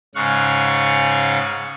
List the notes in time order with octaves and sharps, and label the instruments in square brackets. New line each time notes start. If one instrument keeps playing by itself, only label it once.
[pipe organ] G#2 C#3 F5 F#5 C#6